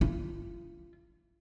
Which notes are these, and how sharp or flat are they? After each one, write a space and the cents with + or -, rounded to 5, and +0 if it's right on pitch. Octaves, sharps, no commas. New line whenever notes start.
F4 -35